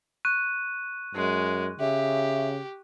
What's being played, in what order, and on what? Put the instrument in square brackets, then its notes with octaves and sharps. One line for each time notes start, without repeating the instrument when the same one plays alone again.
[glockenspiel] C#6 F#6 D#7
[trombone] F#2 [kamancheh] G#3
[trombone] C#3 [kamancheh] G4 [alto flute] E5